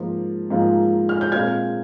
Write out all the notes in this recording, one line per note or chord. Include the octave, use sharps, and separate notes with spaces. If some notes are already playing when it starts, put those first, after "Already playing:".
Already playing: G#2 F3 A#3 F4
G#2 F3 A#3 F4
F6
G6
A#2 G#3 C4 F4 F6 G#6